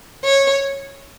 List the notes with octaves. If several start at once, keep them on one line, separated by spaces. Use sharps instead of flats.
C#5